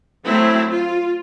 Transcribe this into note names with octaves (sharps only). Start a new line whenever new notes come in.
F#3 A3 C4 E4
F4